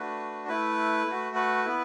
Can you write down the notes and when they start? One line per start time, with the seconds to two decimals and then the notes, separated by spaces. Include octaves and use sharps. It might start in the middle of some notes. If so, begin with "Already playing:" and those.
Already playing: A3 D4 F#4 B4
0.48 A3 E4 B4
1.07 A3 F#4
1.36 B4
1.65 B3 E4